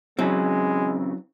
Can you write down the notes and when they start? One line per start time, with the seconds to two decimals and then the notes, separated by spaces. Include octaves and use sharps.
0.19 C#3 E3 F#3 G#3 C4